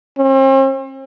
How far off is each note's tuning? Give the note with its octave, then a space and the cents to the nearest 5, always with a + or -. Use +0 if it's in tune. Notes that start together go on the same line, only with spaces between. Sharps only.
C4 +45